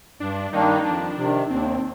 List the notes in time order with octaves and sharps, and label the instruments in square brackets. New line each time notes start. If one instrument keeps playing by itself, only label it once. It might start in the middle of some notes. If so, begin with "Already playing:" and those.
[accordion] G2 [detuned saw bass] D4
[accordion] D#3 G3 A#3 D4 [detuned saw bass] D#4
[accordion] F2 [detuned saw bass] D4
[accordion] C3 D#3
[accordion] D#2 [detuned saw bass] C4
[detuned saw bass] D4
C4